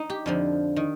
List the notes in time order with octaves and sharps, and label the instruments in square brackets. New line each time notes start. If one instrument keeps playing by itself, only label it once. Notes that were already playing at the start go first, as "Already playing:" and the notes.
Already playing: [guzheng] D#4
G4
F2 D3 F3
D#3